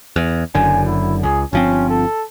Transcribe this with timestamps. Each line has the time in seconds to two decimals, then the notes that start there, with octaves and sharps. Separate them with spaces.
0.16 E2
0.55 F#1 F#2 D3 G#5
0.87 E4
1.23 C#2 G#4
1.53 G1 F3 C4 C#4
1.89 A4